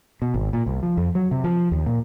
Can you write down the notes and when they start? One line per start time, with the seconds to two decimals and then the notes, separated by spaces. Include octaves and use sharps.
0.22 B2
0.34 G#1
0.53 A#2
0.66 C2
0.83 F3
0.97 F2
1.15 F#3
1.31 C3
1.44 F3
1.71 D#2
1.86 A#2